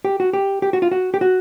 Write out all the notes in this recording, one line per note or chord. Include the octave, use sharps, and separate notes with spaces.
G4
F#4
G4
G4
F#4
F4
F#4
G4
F#4